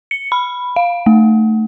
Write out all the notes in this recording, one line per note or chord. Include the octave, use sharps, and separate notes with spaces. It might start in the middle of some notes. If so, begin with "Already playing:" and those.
C#7
B5
F5
A3